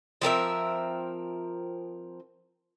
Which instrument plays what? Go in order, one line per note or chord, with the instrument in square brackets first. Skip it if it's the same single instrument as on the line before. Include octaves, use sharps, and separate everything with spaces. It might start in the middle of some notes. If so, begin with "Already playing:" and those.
[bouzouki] F3 C4 A#4 E5